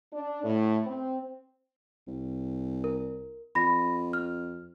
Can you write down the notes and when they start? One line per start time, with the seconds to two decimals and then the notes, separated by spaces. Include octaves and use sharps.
0.13 D4
0.43 A2
0.85 C4
2.07 C2
2.84 A#4
3.55 F2 B5 A#6
4.13 F6